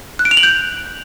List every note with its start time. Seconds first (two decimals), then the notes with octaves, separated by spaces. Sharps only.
0.19 F#6
0.25 D7
0.31 F7
0.37 F#7
0.43 G6